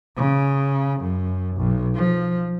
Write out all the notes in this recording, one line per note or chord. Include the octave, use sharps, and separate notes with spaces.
C#3
F#2
B1
F3